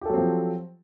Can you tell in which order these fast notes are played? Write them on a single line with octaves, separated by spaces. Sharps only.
G4 A4 F#3 C4 F3